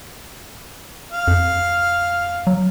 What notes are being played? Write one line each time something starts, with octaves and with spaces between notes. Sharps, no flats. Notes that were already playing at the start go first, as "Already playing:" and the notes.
F5
F2
F#3